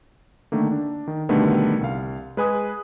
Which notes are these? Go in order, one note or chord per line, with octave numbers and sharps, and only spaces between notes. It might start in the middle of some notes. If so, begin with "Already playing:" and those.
D3 D#3 A3 A#3
D4
D#3
B2 D3 D#3 G3 A3 B3
C2 F5
G#3 B4 G#5 D#6